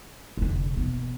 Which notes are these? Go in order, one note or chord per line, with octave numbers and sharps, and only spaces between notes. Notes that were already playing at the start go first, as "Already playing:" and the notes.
F1 D3
B2 B3